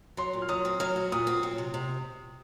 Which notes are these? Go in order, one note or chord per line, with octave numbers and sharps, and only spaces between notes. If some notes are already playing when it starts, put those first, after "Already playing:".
F#3 C6
A#2
F6
F#3 D#6
C4
F#3 F6
F#4
A#2 D#6
C4
F#3
C3
C3